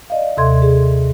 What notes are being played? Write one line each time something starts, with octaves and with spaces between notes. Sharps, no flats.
D5 D#5 F5
D#2 C3 A4 E5 C6 G#6
G#4